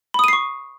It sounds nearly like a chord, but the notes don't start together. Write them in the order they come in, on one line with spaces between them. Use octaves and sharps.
B5 D#6 D#7 C7 C#6